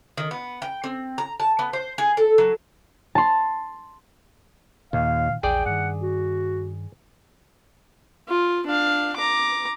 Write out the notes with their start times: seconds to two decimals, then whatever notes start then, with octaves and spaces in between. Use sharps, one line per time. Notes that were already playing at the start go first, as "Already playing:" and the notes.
0.17 D#3
0.31 B3
0.62 G5
0.84 C4
1.18 A#5
1.40 A5
1.59 B3
1.73 C5
1.98 G#4
2.17 A4
2.38 F#3
3.15 A5 C6
4.93 D#2 A#2 D#3 F5
5.43 A#1 E2 G#4 D5 G5
5.66 G2 D#3 F#5
6.01 F#4
8.28 F4
8.66 D4 F5
9.17 A#5 D6